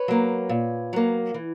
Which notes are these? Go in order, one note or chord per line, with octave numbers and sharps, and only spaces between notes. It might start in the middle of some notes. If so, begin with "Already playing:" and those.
Already playing: B4 C#5
F#3 A#3
A#2
F#3 A#3
E3